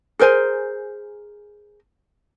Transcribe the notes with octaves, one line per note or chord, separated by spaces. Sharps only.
G#4 A#4 C5 G#5